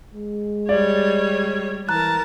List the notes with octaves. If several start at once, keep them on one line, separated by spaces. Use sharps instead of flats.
G#3
G3 C#5 D5
E3 A#4 A5 A#5 F#6